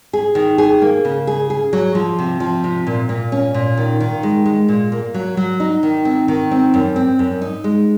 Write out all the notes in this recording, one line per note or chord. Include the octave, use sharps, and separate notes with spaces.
G#4
D#3
G#4
A#3
C#3
G#4
G#4
F#3
F3
C3
F3
C3
A#2
A#2
C#4
A#2
D#3
D#3
G#3
G#3
A#2
A#3
F#3
F#3
D#4
D#3
C4
D#3
C4
F#2
C4
F#2
D#4
G#3